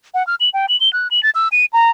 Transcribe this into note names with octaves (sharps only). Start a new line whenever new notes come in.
F#5
F6
F#7
G5
F#7
G7
F#6
F#7
A6
E6
D#7
A#5